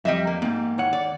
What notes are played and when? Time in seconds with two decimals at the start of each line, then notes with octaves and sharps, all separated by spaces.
0.05 F2 G3 D#5 E5
0.27 A#3
0.42 G#2 A#3 G4
0.78 D#2 C#5 F#5
0.93 D5